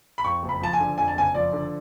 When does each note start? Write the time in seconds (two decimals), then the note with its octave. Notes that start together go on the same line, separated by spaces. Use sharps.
0.18 B5
0.24 F2 C#6
0.43 F#1
0.49 B5
0.61 F3 A5
0.73 G#5
0.80 D3
0.98 F2 G#5
1.08 A5
1.16 F#1 G#5
1.34 F3 D5
1.53 D3